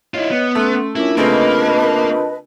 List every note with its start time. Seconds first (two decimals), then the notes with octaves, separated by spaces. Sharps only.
0.14 E4 F4 C#5 D#5
0.31 B3
0.55 A3 C#4 C6
0.96 C#4 D4 E4 F4 A#4
1.17 C#3 A3 A#3 C4 B4 D#5 A5